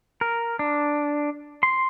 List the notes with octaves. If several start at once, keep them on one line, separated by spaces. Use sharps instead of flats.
A#4
D4
C6